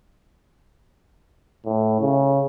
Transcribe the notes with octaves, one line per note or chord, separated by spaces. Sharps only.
A2
C#3